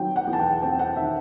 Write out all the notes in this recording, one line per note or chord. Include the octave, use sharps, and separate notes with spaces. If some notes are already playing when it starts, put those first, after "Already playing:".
Already playing: D#3 F#3 C4 G5
F#5
E2
A5
G5
C4 G5
F#5
D#3 E5